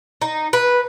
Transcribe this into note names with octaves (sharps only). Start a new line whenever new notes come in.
D#4
B4